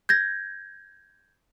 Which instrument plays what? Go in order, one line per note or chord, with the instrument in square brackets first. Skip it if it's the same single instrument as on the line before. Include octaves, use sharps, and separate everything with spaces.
[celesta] G6 G#6 A#6